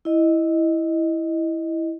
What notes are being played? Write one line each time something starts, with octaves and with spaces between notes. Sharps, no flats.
E4 D#5